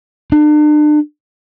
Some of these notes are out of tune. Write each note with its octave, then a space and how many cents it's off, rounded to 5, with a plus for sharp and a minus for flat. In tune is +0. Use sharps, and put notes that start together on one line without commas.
D4 +40